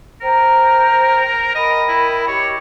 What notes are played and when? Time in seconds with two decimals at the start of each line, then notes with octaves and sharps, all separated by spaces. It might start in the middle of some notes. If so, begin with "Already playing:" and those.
0.21 A#4 C5 G5 A#5
1.55 A#4 D#5 G5 B5
1.89 E4
2.28 G4 C#5 D#5